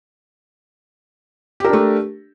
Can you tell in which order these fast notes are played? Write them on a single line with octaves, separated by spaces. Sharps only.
G4 A#4 D4 A3